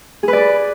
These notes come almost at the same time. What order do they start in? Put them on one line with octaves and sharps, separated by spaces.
G#4 B4 D5